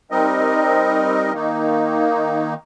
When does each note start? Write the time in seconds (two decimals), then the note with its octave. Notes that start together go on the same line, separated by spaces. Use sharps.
0.11 G3 C4 D#4 A#4 D#5
1.33 D#3 A#3 D#4